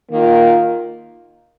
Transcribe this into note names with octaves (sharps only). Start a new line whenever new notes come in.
D#3 A#3 F4